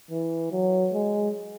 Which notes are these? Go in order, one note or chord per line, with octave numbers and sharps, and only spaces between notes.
E3
F#3
G#3